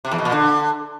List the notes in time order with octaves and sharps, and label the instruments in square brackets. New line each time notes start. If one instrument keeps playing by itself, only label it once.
[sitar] C3
E2
B2
A#2
D3